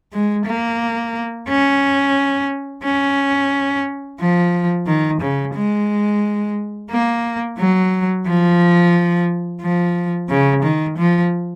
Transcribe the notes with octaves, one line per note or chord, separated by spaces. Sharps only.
G#3
A#3
C#4
C#4
F3
D#3
C#3
G#3
A#3
F#3
F3
F3
C#3
D#3
F3